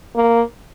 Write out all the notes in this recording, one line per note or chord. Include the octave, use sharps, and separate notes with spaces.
A#3